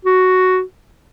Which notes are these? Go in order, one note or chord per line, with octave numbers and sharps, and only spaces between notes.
F#4